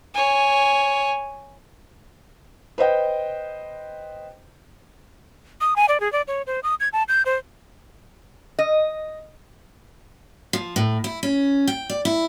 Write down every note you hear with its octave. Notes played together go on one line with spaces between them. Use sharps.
C#5 G#5
B4 C5 D#5 G5
D#6
G#5
D5
G#4
D5
C#5
C5
D#6
G#6
A5
G6
C5
D#5
F3
A2
E4
C#4
G5
D5
E4